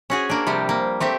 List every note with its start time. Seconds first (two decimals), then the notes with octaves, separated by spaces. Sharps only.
0.10 C#4 F#4 G#4
0.29 A#3 D4
0.47 C3 F3 G3
0.69 A#3
1.00 A3 C4 G4 E5